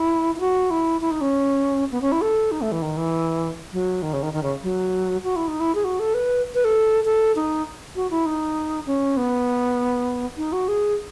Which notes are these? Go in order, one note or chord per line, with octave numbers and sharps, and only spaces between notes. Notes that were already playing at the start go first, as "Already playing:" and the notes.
Already playing: E4
E4
F#4
E4
E4
D#4
C#4
B3
C#4
E4
A4
D#4
A3
E3
D#3
E3
F#3
D#3
C#3
D#3
D#3
C#3
F#3
F#4
E4
D#4
E4
G#4
F#4
A4
B4
B4
A4
A4
D#4
F#4
E4
D#4
C#4
B3
D#4
F#4
G#4